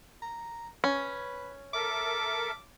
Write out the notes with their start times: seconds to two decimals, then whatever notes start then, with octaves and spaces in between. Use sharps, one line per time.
0.22 A#5
0.84 C#4 B4
1.74 A4 A#4 E5 D6